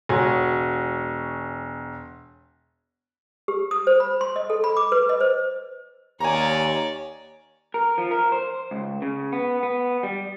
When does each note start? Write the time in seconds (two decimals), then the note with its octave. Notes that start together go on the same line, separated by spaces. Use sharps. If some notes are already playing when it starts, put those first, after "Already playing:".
0.09 E1 F#4 C#5 G#5
3.48 G4
3.71 D#6
3.87 C5
4.00 B5
4.21 C6
4.36 D#5
4.50 A4
4.64 B5
4.77 D6
4.92 B4
5.09 D#5
5.21 C5
6.20 D#2 C#5 D5 G#5 A#5
7.74 A#4
7.98 F3
8.11 A#4
8.32 C5
8.71 C#2
9.02 C#3
9.32 B3
9.63 B3
10.03 G3